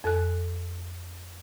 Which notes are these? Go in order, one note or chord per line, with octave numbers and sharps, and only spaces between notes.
F2 A4 G#5 F#6